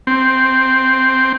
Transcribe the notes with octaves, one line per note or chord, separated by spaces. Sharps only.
C4